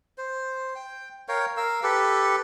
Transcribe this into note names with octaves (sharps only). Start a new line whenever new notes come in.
C5
G5
A#4 C#5 F5 G5
A#4 F5 E6
G4 A4 B4